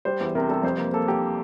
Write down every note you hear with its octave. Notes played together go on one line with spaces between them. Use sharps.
G3 C5
E2
C3 A#4
G3 A4
F2 C5
A#3
A#3 A4
A#3 G4